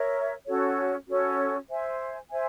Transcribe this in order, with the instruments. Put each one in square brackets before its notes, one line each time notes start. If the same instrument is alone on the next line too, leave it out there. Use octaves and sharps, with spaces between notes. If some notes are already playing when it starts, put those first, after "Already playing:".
Already playing: [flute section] A#4 C#5 E5
C#4 F#4 A4 C#5
C#4 F#4 A4 C#5
C5 E5 G#5
C5 E5 G#5